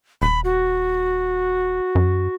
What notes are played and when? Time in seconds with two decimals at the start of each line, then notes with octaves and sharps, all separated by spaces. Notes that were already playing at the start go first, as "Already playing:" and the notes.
0.22 D#1 B5
0.44 F#4
1.95 F#2